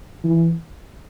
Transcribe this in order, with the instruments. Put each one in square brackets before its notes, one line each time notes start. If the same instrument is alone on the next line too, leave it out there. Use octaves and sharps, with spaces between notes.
[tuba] E3